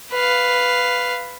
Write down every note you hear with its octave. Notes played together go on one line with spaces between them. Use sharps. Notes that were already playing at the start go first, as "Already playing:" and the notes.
B4 F5